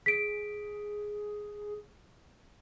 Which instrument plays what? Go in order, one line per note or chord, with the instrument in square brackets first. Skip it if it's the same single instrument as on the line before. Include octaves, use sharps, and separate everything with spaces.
[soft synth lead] G#4 [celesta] B6 D7